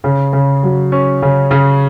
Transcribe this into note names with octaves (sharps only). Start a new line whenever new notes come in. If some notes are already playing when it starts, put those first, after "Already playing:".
C#3
C#3
F#3
C#4
C#3
C#3